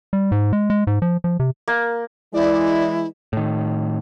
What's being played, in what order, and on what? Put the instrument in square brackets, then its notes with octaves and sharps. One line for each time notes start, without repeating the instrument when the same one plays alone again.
[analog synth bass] G3
G#2
G#3
G#3
G#2
F3
F3
C3
[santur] A#3
[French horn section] E3 G#3 [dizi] E4 [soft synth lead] D5
[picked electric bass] A2 D#3